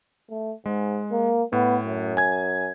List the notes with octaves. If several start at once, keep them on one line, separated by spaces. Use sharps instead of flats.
A3
G#2 G#3
A#3
A2 B3
F#2
G#5 G#6